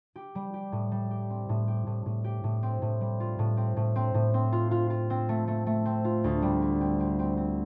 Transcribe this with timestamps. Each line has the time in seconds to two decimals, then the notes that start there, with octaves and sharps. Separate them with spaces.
0.16 G4
0.35 G3
0.54 G4
0.72 A2
0.92 G3
1.11 G4
1.30 C4
1.49 A2
1.68 G4
1.87 A2
2.06 A2
2.24 G4
2.44 A2
2.63 C4
2.82 A2
3.01 G3
3.20 F4
3.39 A2
3.57 C4
3.77 A2
3.96 C4
4.14 A2
4.34 C4
4.52 F4
4.71 F4
4.90 F4
5.10 C4
5.29 A3
5.48 A3
5.67 A3
5.85 C4
6.04 F4
6.24 D2
6.42 G3
6.62 C4
6.81 C4
7.00 C4
7.19 C4
7.37 C4